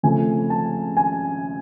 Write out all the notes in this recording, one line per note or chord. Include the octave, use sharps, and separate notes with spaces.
C#3 F3 A3 C4 G#5
A5
G#5